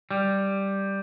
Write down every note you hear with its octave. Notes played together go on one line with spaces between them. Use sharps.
G3